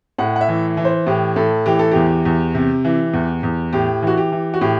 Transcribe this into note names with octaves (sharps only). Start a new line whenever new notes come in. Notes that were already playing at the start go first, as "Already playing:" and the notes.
A2 F#5
F#5
E5
E3
E3
C5
A2 G4
A2 A4
E3 G4
A4
E2 G4
E2
C3
E3
E2
E2
A2 G4
E3 F#4
G4
E3
F#4
A2 G4